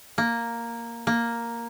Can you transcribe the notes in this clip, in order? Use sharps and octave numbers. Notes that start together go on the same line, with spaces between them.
A#3
A#3